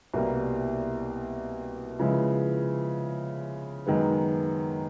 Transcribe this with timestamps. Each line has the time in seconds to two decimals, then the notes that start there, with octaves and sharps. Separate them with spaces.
0.14 C2 B2 G3 A#3
1.99 C#3 F3 G#3 B3 E4
3.87 F#2 D#3 G#3 B3